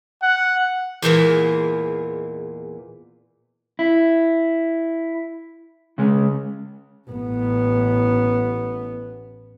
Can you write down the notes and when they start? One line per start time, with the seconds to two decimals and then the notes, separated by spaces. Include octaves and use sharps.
0.22 F#5
1.02 E2 A#2 E3 G#3
3.79 E4
5.98 C#3 G#3 C#4
7.11 A1 B3